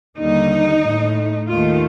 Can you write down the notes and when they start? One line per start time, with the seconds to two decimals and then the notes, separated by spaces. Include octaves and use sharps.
0.17 D#2 D3 G3 D#4
0.84 A2 A3
1.49 D#2 D#3 A3 F4